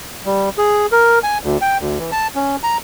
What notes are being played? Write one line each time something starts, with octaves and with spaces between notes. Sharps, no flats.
G3
G#4
A#4
G#5
D2
G5
D2
E3
A5
C#4
A#5